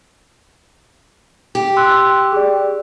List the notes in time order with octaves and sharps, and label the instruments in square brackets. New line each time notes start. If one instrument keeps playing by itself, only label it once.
[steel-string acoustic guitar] G4
[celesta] C6 E6 F#6
G#4 D5